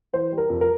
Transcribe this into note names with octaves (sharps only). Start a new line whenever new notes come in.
E3 C5
G3
A#4
F2
A#4